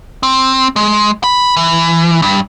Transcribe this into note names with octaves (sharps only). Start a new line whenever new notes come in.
C4
G#3
B5
E3
G2